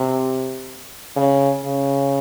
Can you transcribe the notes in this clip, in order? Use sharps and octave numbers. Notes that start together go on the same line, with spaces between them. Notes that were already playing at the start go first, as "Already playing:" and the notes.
Already playing: C3
C#3
C#3